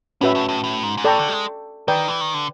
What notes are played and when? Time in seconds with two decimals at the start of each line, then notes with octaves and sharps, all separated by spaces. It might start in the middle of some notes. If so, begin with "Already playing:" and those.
0.21 A2 C#4 F#4 B4 E5
0.35 A2
0.49 A2
0.64 A2
0.83 G#2
0.97 G#2
1.04 A2 A4 D5 G5 A#5 C#6
1.19 D3
1.29 G3
1.32 G#3
1.88 D#3 B4 D5 G5
2.08 E3
2.21 D#3
2.34 D3